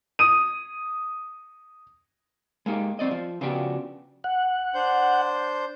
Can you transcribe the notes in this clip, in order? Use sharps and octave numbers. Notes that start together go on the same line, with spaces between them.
D#6 D#7
G#3 A#3 D#4 G4
F2 C4 D5 D#5
F3
C#3 F3 B3 D4 F#4 G4
F#5
D4 C5 G6